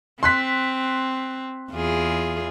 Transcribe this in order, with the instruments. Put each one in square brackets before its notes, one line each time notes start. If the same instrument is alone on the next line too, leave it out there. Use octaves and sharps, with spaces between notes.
[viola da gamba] C4 [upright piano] C6 F#6 B6
[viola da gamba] E2 F4 G#4